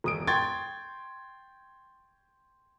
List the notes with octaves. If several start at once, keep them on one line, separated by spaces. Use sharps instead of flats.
E1 D#6 D7
G5 C6 C#6 G#6 A6